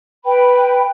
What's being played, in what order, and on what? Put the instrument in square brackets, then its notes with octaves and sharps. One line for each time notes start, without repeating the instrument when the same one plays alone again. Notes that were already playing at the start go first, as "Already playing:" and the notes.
[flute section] B4 G5 B5